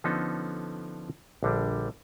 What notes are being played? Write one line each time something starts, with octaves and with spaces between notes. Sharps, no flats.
D3 F3 B3 C#4 D#4 A4
A#1 D3 G3